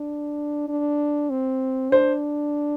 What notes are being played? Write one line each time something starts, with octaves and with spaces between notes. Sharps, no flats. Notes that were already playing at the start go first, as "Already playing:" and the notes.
Already playing: D4
D4
C4
D4 C5